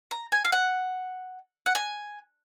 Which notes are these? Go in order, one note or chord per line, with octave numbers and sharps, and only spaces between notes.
A#5
G#5
F5
F#5
F#5
G#5